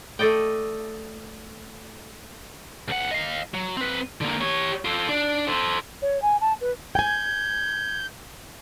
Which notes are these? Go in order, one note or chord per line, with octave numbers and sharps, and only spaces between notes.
A3 A4 D5 D#5 G5
C#2 F#5
D#5 F5
F#3
C4 B4
D3 A#3
G4 C#5
F4 A4
D4
A4 C5
C#5
G#5
A5
B4
G5 G#5 G6 G#6